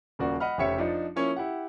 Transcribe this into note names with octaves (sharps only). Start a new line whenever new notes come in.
D#1 C#3 F3 A#3 F#4 D5
D#5 F#5 B5 F6
F1 C#3 G4 C#5 E5 C#7
F3 D4 D#4
F3 A#3 C#4 E4 C#5
E4 G4 F#5